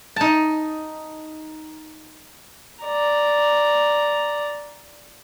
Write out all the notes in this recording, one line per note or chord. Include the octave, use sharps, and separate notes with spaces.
D#4 A5
D5 A#5